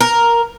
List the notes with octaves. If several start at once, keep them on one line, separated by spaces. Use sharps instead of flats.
A#4